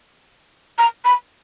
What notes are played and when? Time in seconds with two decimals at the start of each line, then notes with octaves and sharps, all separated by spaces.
0.78 A#5
1.05 B5